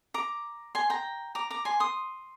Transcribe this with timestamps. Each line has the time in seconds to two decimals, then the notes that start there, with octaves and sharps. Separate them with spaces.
0.14 A#5 D6
0.75 G#5 C6
0.90 G5 A#5
1.35 A#5 D6
1.50 A#5 D6
1.65 G#5 C6
1.80 C6 D#6